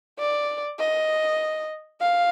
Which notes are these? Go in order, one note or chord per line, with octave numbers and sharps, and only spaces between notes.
D5
D#5
F5